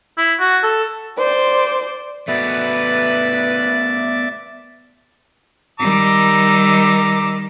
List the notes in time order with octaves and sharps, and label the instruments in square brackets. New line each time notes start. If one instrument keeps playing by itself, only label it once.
[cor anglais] E4
F#4
A4
[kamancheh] C5 D5
[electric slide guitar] A3 B3 F#4 [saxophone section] B4 [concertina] D5 E5 D6
[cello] D#3 G3 [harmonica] A#5 D6 E6